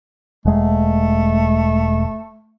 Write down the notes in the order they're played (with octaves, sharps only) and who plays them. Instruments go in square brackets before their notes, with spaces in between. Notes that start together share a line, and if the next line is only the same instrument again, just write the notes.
[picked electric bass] E1 G#3 [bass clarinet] A3